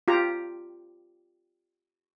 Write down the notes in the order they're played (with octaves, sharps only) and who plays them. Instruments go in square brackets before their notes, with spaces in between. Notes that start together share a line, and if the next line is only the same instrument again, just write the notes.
[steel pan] F4 G4 A#5